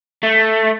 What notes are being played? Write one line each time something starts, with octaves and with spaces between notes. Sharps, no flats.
A3